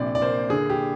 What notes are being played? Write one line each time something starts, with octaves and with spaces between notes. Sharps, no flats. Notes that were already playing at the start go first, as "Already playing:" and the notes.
Already playing: A#1 C3 D5
D5
A#3 C5
D3 G#4
G4